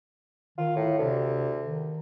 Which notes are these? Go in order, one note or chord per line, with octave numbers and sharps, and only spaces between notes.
D#3 F4
A2
D2 C3
D#3